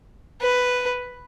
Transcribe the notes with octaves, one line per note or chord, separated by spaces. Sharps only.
B4